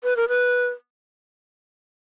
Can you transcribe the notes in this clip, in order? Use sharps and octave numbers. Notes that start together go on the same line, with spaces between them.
B4
A#4
B4